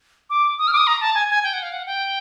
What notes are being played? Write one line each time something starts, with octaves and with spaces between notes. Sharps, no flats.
D6
D#6
F6
D6
D#6
A#5
A5
G#5
G#5
G5
F#5
F5
F#5
G5